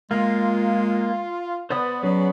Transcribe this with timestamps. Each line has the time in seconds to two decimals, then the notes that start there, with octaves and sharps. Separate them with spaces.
0.11 G#3 A#3 F4
1.70 B3 C5 D5 D#6
2.03 F#3 C#4 G#4 D5